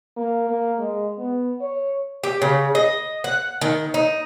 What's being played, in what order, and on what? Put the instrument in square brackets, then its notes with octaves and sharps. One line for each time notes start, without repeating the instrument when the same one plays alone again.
[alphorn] A#3
A#3
G#3
B3
C#5
[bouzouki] G4
C#3
D#5
F#5
D#3
D#4